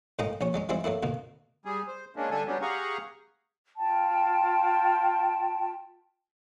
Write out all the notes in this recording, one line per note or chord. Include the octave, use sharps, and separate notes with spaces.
A2 G#3 A#3 D#4 D#5 G5
A#1 C#4 C#5
F#3 G#3 C#4
E3 F3 G3 G#3 C4 E4
F#3 A3 A#3 E4
D2 B2 A#3
G3 G#4
C5
G#3 A#3 C#4 D4
D3 G3 D4 A4 G#5
F#3 G3 B3 C#4 D4 G4
G4 G#4 F5 F#5 A#5 C#6
F4 G5 A5